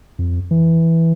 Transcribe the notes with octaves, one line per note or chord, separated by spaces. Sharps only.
F2
E3